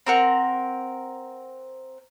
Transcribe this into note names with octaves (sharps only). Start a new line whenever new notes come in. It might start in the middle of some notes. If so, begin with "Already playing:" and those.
C4 A#4 F#5